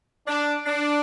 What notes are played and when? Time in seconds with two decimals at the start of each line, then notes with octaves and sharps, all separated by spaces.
0.27 D4
0.66 D4